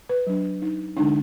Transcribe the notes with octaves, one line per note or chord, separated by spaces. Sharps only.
B4
F#3 D4
D#4
D3 G#3 D4 D#4